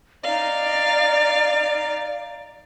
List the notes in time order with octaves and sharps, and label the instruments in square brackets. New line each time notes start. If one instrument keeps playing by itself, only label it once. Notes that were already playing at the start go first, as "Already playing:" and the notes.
[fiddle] D#4 F5 [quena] D5